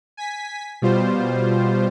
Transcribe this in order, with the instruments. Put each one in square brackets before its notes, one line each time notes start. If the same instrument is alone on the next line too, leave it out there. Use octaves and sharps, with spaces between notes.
[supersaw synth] G#5 B6
B2 G3 F4 C5